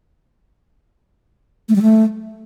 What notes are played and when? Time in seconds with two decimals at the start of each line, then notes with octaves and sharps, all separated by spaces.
1.69 A3
1.75 G3
1.82 A3